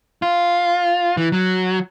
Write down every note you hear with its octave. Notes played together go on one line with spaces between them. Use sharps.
F4
E3
F#3